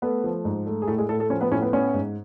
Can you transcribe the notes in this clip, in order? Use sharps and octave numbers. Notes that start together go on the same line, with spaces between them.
A3 B3 B4
F3
G#2
A3
G#4
A2 A3 A4
G#3 G#4
A2 A3 A4
A3 A4
F3 C#4 C#5
B3 B4
A2 C#4 C#5
B3 B4
B3 C#4 C#5
G#2